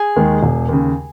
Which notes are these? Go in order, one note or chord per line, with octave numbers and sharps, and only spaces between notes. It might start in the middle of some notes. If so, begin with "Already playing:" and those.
Already playing: G#4
D#2 D#3 G#3
E1
D#2 C#3